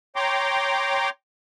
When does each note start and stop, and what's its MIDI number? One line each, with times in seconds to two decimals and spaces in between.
0.16 1.10 73
0.16 1.10 79
0.16 1.10 82
0.16 1.10 84
0.16 1.10 86